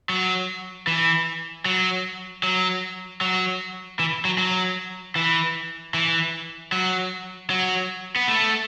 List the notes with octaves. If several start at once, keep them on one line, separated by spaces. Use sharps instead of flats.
F#3
E3
F#3
F#3
F#3
E3
F#3
F#3
E3
E3
F#3
F#3
B3
A3